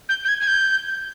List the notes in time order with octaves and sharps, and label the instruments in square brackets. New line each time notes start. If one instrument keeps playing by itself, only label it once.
[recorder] G6
G6
G#6
G#6
G6